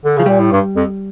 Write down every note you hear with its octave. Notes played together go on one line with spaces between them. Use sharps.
D3
C#3 F3
A#2 G3
A2
G2
F2